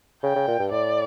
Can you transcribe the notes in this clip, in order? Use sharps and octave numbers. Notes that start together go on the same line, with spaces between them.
C#3 G5
C#3
A#2
G2
A2 D5